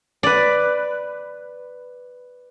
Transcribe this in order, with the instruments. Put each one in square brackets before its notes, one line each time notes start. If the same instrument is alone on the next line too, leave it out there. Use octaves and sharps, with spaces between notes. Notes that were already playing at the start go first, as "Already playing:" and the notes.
[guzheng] B4 D5